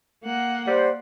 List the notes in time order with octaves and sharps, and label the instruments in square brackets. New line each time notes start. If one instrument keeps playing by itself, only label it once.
[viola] A#3 F#5
[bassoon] G3 [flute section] C5